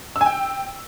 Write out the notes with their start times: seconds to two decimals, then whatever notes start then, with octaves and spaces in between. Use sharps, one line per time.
0.16 E6
0.21 G#5
0.26 G5